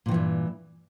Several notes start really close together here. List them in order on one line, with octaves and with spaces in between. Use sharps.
A#2 D#3 E3 G2